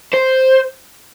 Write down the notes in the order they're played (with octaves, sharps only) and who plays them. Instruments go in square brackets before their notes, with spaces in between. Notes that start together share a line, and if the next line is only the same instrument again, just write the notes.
[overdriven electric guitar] C5